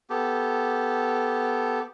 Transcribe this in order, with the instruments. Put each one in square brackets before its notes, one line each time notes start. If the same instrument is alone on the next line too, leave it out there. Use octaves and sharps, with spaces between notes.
[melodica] B3 G4 A4